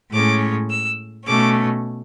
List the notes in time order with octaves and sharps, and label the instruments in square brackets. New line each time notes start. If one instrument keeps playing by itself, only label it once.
[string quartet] A2 G#3 C#4 D6
E6
B2 A3 C#4 D6